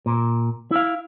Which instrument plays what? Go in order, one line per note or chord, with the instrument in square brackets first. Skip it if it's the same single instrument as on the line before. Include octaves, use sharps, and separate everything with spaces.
[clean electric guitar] A#2
E4 F5